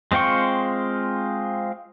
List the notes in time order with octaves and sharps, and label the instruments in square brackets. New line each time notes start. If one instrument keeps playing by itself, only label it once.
[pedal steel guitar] G#3 C4 F4 G5 C#6